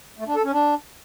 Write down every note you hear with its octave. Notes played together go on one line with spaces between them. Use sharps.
A3
D4
A4
C#4
D4